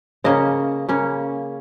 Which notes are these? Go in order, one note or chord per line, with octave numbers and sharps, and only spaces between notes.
C#3 A#3 C#4 D#5
C#3 A#3 C#4